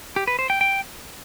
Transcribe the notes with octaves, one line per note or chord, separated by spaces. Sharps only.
G4
B4
C5
G5
G5